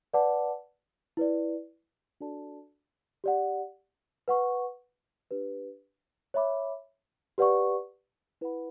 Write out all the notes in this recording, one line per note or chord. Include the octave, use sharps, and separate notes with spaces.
B4 D5 F#5 A5 D6
E4 B4 D5
D4 F#4 A4 D5 A5
G4 D5 F#5
B4 F#5 C#6
D4 G4 B4
C#5 E5 B5 D6
G4 B4 D5 F#5 C#6
E4 B4 F#5 B5